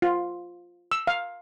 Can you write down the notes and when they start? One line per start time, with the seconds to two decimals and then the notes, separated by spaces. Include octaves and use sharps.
0.02 F4
0.92 E6
1.07 F5